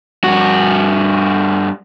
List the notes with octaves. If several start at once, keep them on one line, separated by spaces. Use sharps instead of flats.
G2 F#4